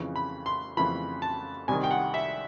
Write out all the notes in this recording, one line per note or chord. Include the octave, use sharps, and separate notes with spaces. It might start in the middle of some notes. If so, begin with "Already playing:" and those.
Already playing: F2 C#3 E3
B5
C6
F2 C#3 E3 B5
A5
C2 C3 D#3 G#5
G5
F#5
E5